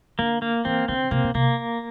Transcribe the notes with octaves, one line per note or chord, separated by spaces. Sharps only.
D3 A#3
A#3
E3 C4
D3 C4
C3 A#3
A#2
C3 A#3